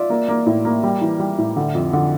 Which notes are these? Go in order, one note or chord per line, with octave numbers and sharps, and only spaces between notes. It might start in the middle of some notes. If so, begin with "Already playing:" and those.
Already playing: F4 D5 E5
A#3
A#3
A2
A#3
G3
E3
G3
A2
D3
F2
D3